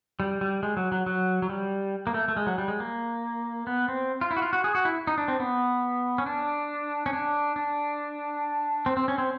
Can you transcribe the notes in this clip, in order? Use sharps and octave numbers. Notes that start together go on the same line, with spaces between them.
G3
G3
G#3
F#3
F#3
F#3
F#3
G3
A#3
A3
A3
G#3
F#3
G3
G#3
A#3
B3
C4
F4
E4
F#4
F4
F#4
G#4
F#4
E4
D#4
D4
C4
B3
C#4
D4
C#4
D4
D4
C4
C4
C#4
C4